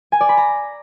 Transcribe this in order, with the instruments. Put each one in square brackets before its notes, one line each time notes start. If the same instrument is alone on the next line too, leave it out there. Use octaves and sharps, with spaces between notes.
[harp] G#5
D5
B5
A#5